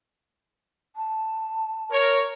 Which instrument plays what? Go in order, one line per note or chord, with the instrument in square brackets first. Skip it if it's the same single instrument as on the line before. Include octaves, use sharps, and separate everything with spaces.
[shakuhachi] A5
[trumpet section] A#4 C#5